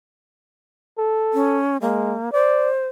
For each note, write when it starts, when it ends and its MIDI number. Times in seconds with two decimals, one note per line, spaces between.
0.98 1.60 69
1.34 1.77 61
1.81 2.16 56
1.81 2.33 58
2.33 2.87 72
2.33 2.70 74